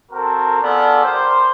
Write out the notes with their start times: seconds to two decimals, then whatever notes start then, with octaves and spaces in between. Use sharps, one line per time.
0.12 C4 F#4 A4 A#4
0.62 B3 D4 F4 G#4 A4 D5
1.04 G3 G4 A#4 C5